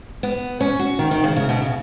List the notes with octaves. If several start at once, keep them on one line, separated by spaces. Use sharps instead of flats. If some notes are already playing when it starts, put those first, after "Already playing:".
B3
C#4
F#4
D#3
D#3
C#3
C#3
B2
C#3